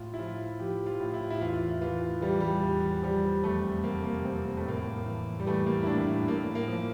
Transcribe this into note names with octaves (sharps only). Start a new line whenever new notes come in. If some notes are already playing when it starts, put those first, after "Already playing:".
Already playing: A2 F4
E4
F3 F4
F3 G4
F4
A2
E4
E4
E2 F4
E3 F4
E3 G3
G3
E2
F3 G3
F2 A3
C3 A#3
A#3
F2 C4
A#3
A3
A2 A#3
E3
G3
E3 A3
A#3
E4
A2 D4
A2 A#3
A#3
F3